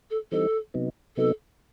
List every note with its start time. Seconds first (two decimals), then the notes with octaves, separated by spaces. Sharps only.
0.10 A4
0.32 E3 G3 C4 D#4 A4
0.74 C3 F#3 B3 D#4
1.17 C3 F#3 B3 D#4 A4